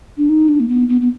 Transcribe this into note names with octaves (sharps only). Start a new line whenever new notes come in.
D4
D#4
D4
A#3
B3
B3
B3